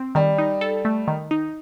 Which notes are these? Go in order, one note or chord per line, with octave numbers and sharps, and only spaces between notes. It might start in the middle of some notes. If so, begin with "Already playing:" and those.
Already playing: C4
D#3 G3
D#4
A4
A3
D#3
D#4